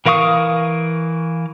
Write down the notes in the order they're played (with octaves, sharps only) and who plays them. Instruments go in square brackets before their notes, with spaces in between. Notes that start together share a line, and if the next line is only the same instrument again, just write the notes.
[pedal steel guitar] E3 A#4 F5 C#6 D#6